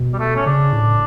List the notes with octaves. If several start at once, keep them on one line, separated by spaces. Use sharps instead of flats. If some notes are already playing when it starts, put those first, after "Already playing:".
Already playing: B2
G3
A3
C#4
C#3 D4
A2